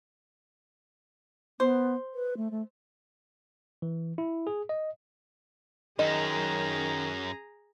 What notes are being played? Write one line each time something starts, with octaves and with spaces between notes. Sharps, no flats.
B3 C5
B4
A3
A3
E3
E4
G#4
D#5
F#2 D#3 G#4 D#5 A#5